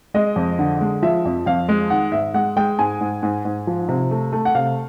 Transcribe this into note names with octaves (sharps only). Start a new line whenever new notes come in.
G#3 D#5
F2
D3
G#3
F3 E5
F2
F2 F5
G#3
D#3 F#5
G#2 E5
G#3 F#5
G#3 G5
G#2 G#5
G#2
G#2
G#2
F3
C3
A3
A3
F#5
C3 F5